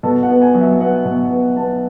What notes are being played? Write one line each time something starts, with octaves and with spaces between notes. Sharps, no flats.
B2 A4
F#5
B3
G#5
F#3
E5
B3 F#5
B2
B3
B3 A5